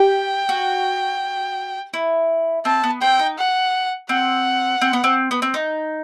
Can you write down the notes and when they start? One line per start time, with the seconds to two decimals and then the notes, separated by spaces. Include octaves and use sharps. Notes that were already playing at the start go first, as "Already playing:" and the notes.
Already playing: G4 G5
0.49 F#4
1.94 E4
2.65 C4 A5
2.84 B3
3.01 C4 G5
3.19 D#4
3.38 F#5
4.09 C4 F#5
4.81 C4
4.93 B3
5.04 C4
5.31 B3
5.42 C4
5.54 D#4